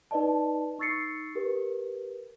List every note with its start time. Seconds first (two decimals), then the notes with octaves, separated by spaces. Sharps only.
0.11 D#4 B4 D5 D#5 A5
0.79 D#4 C#6 E6 A6 C7 C#7
1.35 G4 A#4 B4